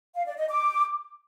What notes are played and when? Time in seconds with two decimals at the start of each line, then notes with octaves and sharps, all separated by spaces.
0.15 F5
0.26 D5
0.37 D#5
0.49 D6